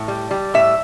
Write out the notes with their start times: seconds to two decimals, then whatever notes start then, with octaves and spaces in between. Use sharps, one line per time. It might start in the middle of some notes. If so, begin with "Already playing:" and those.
Already playing: A2
0.08 G3
0.31 G3
0.54 A2 E5